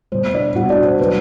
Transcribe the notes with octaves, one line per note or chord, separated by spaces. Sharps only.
B2 G3 C5
D4 D5
B2 G3 F#4 F#5
D4 D5
C5
F#3 A3 B4